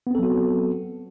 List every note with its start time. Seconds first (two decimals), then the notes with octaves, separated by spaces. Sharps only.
0.07 B3
0.11 C4
0.15 A4
0.19 F#3
0.23 F#4